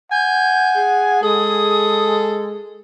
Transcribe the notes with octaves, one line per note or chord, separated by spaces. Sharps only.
F#5 G#5 G6
G#4
G#3 A4 D#6